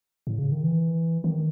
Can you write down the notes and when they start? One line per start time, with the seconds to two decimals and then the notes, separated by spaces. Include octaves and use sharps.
0.27 A2
0.39 C#3
0.52 D#3
0.63 E3
1.24 D#3